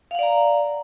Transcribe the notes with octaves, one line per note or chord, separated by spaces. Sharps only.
D5 F5 F#5 A#5